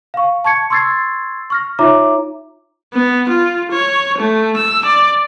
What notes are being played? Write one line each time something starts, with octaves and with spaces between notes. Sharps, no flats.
F5 C#6
A5 C#6 G#6 C#7
C6 C#6 E6 G#6 A6 C7
C#6 F6 A#6
D#4 F4 C#5 E5 A#5 D6
B3
F4
C#5
A3
E6
D5